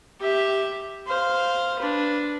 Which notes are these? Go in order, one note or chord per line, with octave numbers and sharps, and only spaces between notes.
G4 E5
C5 F5
D4 B4